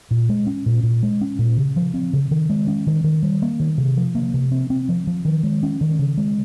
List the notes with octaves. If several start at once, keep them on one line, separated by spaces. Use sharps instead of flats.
A#2
G#3
C#4
A#2
A#2
G#3
C#4
A#2
C#3
F3
C4
C#3
D#3
G#3
C#4
D#3
D#3
G3
A#3
D#3
C3
F3
A#3
C3
C4
C4
F3
F3
D#3
G#3
C#4
D#3
C#3
G#3